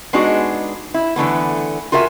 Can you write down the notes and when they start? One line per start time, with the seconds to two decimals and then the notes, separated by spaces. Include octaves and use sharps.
0.13 G#3 B3 D4 D#4 F#4 G#4
0.94 E4
1.16 D3 E3 A3 B3
1.92 F4 F#4 A#4 E5 G5 G#5